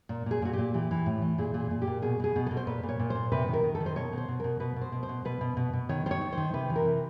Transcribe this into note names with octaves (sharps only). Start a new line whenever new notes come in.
A#2
A#2 G#4
A#2 F#4
A#2 G4
E3 G4
E3
A2
E3
A#2 G#4
A#2
G#4
A#2
G4
A#2
B2 G#4
B2 G#4
B2
B2 A4
C5
A#2 B4
A#2
C#5
A#2
A#2 C5
C3 B4
D#3
A#4
D#3
A4
D#3
C5
B2 C#5
B2 C5
B2
B2 A#4
B2 B4
B2
C5
B2
C5
B2
B2 B4
B2
B2
B2
D#3 C#5
D#3 C5
C#5
D#3
D#3 C5
C3 B4
E3
A#4
C3